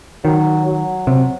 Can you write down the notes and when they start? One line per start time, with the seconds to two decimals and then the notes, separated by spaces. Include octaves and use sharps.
0.24 D#3 F#3
0.66 F#3
1.07 C3